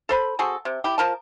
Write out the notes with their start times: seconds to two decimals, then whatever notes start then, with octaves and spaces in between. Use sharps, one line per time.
0.09 A4 C5 B5
0.39 C4 F#4 G#4 A4
0.65 C3
0.84 E4 G4
0.98 F3 A#4 A5